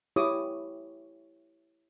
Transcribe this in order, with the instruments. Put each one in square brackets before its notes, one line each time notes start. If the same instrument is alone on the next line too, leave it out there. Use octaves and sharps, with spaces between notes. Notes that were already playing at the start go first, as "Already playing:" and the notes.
[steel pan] E4 G4 C#5 D6 D#6